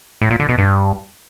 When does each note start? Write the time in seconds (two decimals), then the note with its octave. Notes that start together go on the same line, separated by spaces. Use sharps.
0.22 A2
0.31 A#2
0.40 D3
0.49 B2
0.58 G2